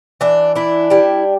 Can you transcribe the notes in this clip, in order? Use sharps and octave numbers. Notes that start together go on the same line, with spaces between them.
E3 D4
D4 E4
G3 E4